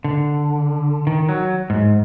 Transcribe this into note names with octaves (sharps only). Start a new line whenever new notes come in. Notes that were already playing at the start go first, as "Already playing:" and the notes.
D3
D#3
F#3
G#2